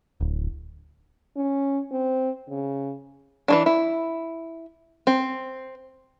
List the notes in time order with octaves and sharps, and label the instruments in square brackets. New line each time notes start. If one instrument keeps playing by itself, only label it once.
[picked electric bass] D1
[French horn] C#4
C4
C#3
[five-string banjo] E3 F#3 D4
E4
C4